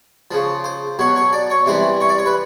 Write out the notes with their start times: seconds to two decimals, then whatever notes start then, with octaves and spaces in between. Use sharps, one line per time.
0.31 C#3 F3
0.64 C5
0.99 B2 F#3 C#5
1.16 C#5
1.33 D5
1.50 C#5
1.66 C3 E3 G3 C5
2.01 C#5
2.09 D5
2.18 C#5
2.26 B4